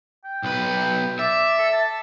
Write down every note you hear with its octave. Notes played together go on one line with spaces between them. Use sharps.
G5
B1 B4
D5 E5
A4
A5